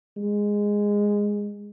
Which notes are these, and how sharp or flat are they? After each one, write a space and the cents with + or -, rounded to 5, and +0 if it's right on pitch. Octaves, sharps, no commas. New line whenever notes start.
G#3 -10